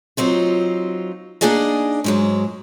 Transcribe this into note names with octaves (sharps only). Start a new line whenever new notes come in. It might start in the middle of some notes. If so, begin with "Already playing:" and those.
F#3 C4 D#4 F4
A#3 D4 D#4 G#4 D5 D#5
G#2 F#3 G#3